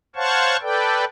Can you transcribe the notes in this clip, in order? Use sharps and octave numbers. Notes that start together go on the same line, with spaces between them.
C5 C#5 F5 F#5 A5 C#6
A4 B4 D5 G5